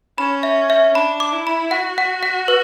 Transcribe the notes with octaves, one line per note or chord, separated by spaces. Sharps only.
C#4 B5
E5
E5
D4 B5
D6
E4
B5
F#4 F#5
F#5
F#5
B4